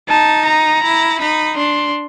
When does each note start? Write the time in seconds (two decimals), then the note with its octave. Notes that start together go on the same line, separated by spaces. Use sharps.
0.08 D#4 A5
0.46 A#5
0.83 E4
1.20 D#4 B5
1.57 D4 C6